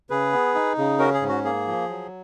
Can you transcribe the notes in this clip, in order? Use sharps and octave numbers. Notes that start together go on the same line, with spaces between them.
C#3 G#4 B4
B3
D#4
C#3
C#4 F#4 A#4
G#4
G#2
F#4
A#3 G#4
F3
F#3